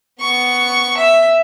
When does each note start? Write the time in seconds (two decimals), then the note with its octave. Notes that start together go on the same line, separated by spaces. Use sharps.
0.21 B3 C#6
0.97 E5